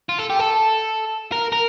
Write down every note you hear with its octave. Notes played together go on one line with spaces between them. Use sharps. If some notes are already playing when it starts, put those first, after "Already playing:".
F4
A4
G4
A4
A#4
A#4